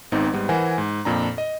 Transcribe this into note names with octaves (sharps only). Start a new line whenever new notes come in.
G#1 G#2 B3 C4 D#4
G#2 G3 B3
E3 A#4 C5 F#5 G#5
G#2
F2 A#2 D4 A#5
D#5